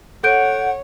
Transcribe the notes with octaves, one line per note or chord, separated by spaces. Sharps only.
A4 C#5 F#5 G6 D7